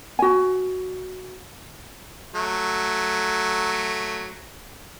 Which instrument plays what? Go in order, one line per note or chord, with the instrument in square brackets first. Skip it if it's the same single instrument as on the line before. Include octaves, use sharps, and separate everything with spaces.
[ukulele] F#4 G#5
[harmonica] F#3 A3